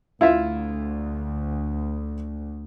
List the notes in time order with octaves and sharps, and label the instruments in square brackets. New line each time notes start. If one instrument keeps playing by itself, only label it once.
[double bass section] D2 [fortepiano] E4 F4 E5